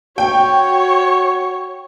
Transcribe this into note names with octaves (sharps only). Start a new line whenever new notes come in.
F#4 C#5 G5